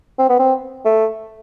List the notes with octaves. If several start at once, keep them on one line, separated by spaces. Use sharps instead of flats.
C4
B3
C4
A3